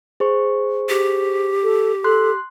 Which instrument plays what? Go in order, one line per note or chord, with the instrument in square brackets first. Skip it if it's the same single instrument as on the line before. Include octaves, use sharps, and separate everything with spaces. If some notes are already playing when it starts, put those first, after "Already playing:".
[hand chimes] G#4 C5 C#6
[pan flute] G4
[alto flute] A4
[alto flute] A4 [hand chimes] C6 F#6